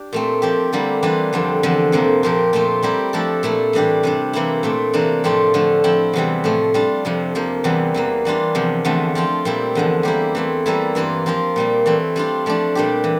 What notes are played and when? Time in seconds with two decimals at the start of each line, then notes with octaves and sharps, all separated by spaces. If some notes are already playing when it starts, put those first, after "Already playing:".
Already playing: D4 G4
0.13 A#2 A3 C4
0.42 F3 C4 G4
0.73 D3 G3 A#3 E4
1.03 E3 G3 D4 F4
1.33 F2 D3 G3 C4
1.63 E2 D3 F3 C4
1.92 F2 C3 F3 A#3
2.23 A#2 F3 C4 G4 A#4
2.53 A#2 A3 C4 F4
2.83 G3 C4 E4 G4 A#4
3.13 F3 A3 D4 A4
3.43 A#2 A3 E4
3.73 A2 E3 G3 D4 G4
4.03 C3 G3 D4
4.33 C3 E3 A#3 E4
4.63 A#2 A3 C4
4.93 C3 E3 A#3 D4
5.24 A2 F3 A3 C4 F4
5.54 D3 F3 A3
5.84 F3 C4 E4
6.13 E2 C3 E3 G3
6.44 A2 F3 A3
6.74 G3 D4 F4
7.05 F2 C3 F3
7.35 C3 F3 A#3
7.64 E2 C3 E3 G3
7.94 E2 E3 A#3
8.25 E3 G3 D4 F4
8.55 E2 C3 F3
8.85 E2 D3 F3 A3 C4
9.15 F3 C4 F4
9.45 A#2 G3 C4 E4
9.75 E2 D3 F3
10.03 G3 A#3 E4 G4
10.35 E3 A3 C4
10.66 E3 G3 A#3 E4 A4
10.95 G2 E3 A#3 F4
11.26 F3 C4 F4 A#4
11.56 A#2 G3 A#3
11.86 E3 A3 C4
12.16 G3 D4 F4
12.46 F3 A3 D4
12.75 A#2 G3 D4 G4
13.04 E3